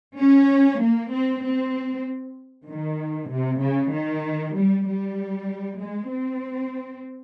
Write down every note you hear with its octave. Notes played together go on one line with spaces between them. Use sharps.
C#4
A#3
C4
C4
D#3
C3
C#3
D#3
G3
G3
G#3
C4